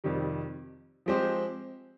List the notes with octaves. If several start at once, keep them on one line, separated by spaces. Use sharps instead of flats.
F2 C3 D#3 G3
F3 G#3 C4 G4 C5